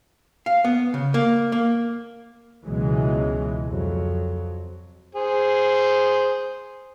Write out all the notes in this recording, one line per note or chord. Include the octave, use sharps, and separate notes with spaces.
F5
B3
C#3
A#3
A#3
C#2 B2 E3 F#3 G#3
F2 F#3
G#4 C5